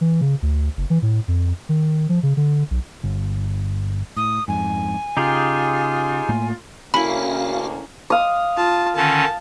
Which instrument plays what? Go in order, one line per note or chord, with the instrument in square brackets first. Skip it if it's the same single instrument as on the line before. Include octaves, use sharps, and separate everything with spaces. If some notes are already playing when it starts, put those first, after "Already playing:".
[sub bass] E3
C#3
D2
F#1
E3
A2
F2
D#3
F3
C#3
D3
B1
[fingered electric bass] G1
[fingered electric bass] A2 [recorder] D#6
[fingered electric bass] F2 G#2 [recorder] G#5
[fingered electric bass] C#3 [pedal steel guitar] D#4 G4 G#4 [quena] F4
[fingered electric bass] A2 A3 A#3
[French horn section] D2 C#3 A#3 [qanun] C#4 E4 [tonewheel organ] F#4 F5 [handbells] B5
[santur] F5 D#6
[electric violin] F4 A5
[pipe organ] D3 D#3 C#4 [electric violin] A5